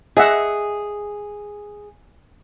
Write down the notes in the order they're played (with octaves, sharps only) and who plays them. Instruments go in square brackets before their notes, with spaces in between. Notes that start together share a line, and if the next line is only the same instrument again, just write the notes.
[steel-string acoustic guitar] G#4 [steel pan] D#5 E5 F#5